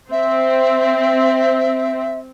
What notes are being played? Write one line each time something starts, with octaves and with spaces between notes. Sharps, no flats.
C4 E5